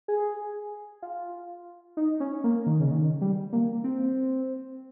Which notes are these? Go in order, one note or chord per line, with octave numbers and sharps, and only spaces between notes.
G#4
F4
D#4
C#4
A#3
D#3
C#3
D#3
G3
A#3
C4